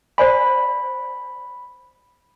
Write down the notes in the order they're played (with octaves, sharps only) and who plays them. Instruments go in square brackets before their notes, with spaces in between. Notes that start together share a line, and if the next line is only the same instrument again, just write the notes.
[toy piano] C5 D5 G#5 [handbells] B5